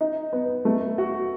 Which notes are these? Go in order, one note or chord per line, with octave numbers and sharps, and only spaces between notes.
D#4
B3
A3
F#4